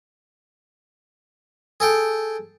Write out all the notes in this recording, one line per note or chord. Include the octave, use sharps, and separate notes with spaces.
G#4 A4 G5